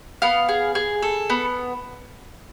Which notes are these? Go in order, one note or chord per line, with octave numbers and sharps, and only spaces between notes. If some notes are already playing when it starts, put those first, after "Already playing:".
B3 F5
G#4
G#4
A4
B3